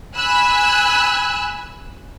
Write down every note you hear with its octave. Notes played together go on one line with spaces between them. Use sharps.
G#5 B5 E6 F#6